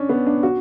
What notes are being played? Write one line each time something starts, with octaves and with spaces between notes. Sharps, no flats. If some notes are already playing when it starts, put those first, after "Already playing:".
Already playing: C#4 D4
B3
D4
F#4